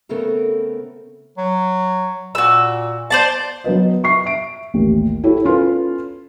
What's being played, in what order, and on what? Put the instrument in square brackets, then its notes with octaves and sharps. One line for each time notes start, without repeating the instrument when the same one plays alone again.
[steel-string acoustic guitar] C#3 A3 B3 C4 A4 A#4
[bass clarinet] F#3
[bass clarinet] A#2 [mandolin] F#4 E6
[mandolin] C5 D5 A5
[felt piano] F#3 B3 B4 D#5
E5 C#6 C7
E5 D7
A1 D#2
E4 F#4 G4 A4 C#5
C#4 F4 A4 B4